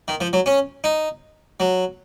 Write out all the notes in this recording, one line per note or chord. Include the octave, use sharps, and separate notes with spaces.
D#3
F3
F#3
C#4
D#4
F#3